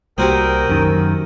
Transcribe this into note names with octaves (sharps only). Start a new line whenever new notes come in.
C2 A#3 C4 F#4 G4 A#4 G5 D#6
F#2 D#3